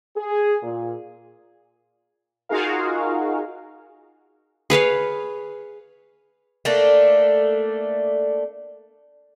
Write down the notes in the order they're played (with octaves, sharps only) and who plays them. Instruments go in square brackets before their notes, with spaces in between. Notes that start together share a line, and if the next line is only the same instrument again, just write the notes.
[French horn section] G#4
A#2
[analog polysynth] D#4 F4 F#4 G#4 A#4 F5
[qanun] G#4 B4 C#5 F5
[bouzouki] A3 A#3 D4